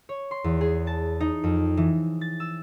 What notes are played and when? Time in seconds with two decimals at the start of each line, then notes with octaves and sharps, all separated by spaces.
0.09 C#5
0.31 C6
0.44 E2
0.61 G#4
0.87 A5
1.20 D#4
1.44 F2
1.77 E3
2.21 A6
2.40 E6